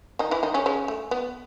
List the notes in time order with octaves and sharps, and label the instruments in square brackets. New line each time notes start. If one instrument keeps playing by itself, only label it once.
[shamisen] D#3 D#4
E3 E4
D#3 D#4
C#3 C#4
C#3 C#4
A3
B3